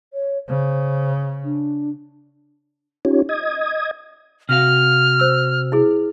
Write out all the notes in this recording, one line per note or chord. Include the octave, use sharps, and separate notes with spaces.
C#5
C#3 C5
D4
C#4 D#4 F4 G4 C#5
D#5 D#6 G#6
C3 F#4 F5 F6
C5 E6
E4 G#4